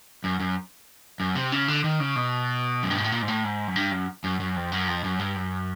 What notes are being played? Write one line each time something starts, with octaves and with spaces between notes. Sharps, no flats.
F#2
F#2
F#2
C3
C#3
D3
D#3
C#3
B2
F#2
G2
G#2
A2
A#2
G#2
A2
G#2
F#2
G2
F#2
F#2
F#2
F2
F#2
F2
F#2
G2
F#2